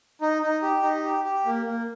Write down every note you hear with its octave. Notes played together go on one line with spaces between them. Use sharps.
D#4
D#4
G4
D#4
G4
G4
A#3
A#3